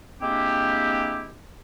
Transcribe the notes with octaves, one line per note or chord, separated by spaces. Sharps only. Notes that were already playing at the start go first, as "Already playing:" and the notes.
G#3 A#3 C4 D4 E4 G4